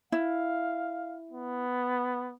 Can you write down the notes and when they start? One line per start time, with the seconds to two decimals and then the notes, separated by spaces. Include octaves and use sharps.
0.12 E4 F5
1.31 B3